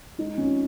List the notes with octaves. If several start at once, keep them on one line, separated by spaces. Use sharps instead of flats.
G#3 D#4
F2 C#4